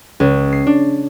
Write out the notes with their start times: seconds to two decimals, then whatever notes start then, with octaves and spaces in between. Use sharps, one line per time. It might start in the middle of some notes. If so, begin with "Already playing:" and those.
0.20 C#2
0.53 C7
0.67 D4